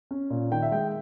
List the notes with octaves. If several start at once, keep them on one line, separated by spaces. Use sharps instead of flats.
C#4
A#2
D#3 G5
E5
G#3 G5